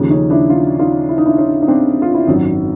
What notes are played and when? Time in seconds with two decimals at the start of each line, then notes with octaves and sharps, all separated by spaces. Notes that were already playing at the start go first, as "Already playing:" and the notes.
Already playing: D#2 C#3 F3
0.10 C#4 D#4
0.30 D4 E4
0.50 D#4 F4
0.79 D#4 F4
1.09 E4
1.18 D#4
1.26 D4 E4
1.38 C#4 D#4
1.63 D#4
1.68 C4 D4
2.02 F4
2.15 E4
2.27 G#1 F#2 D#3 C#4 D#4